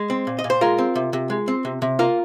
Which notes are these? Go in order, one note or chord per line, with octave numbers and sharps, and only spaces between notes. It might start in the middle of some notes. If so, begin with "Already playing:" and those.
Already playing: G#3
C4
A#2
D#5
A#2
C5
G#3 F4 A#4
C4
C3
C3
G#3
C4
C3
C3
A#3 F4 A#4